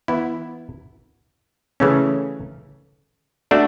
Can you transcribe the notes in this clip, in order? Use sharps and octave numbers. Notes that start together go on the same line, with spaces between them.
E3 B3 E4
C#3 E3 A3 C#4
A3 D4 F#4